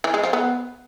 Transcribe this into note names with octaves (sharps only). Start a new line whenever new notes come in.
E3
G#3
F3
B3